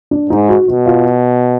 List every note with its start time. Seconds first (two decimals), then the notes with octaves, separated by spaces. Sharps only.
0.11 D4
0.30 G#2 D#4
0.49 F#4
0.68 B2 F#4
0.86 F4